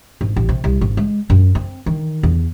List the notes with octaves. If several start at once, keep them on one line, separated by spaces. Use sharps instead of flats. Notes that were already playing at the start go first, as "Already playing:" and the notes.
G#1
A1
C3
C2
G#1
G#3
F#2
C4
D#3
E2